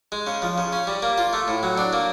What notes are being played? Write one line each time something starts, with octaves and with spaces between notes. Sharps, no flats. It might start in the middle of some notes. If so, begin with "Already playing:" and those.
G#3
C#3
F3
C#3
C#4
G3
A#3
F4
A3
A2
F#3
D4
A#3